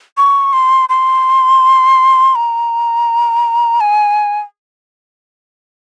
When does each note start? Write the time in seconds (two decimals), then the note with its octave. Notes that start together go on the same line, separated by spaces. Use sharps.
0.17 C#6
0.53 C6
0.89 C6
2.35 A#5
3.80 G#5